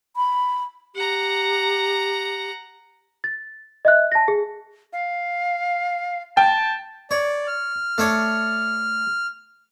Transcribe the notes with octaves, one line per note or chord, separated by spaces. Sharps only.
B5
G4 F#5 A#5
A6
D#5 E5 F#6
A5 A#6
G#4
F5
G5 A5
C#5 D5
F6
A3 D4 C#5